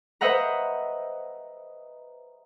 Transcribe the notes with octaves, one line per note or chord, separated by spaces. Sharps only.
B4 C5 D#5 E5 F#5 A#5